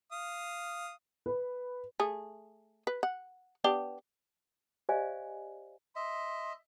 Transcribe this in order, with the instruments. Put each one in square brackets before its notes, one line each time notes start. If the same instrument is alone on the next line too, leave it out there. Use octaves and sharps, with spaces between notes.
[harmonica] F5 D#6
[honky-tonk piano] B4
[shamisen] A3 G#4
B4
F#5
B3 D4 G4
[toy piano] G4 C5 D5 D#5 F5 G#5
[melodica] D#5 E5 [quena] C6